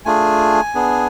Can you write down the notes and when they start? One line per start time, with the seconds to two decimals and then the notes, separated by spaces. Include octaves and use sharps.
0.05 A3 D4 F4 G#4 G#5
0.74 B3 D4 G#4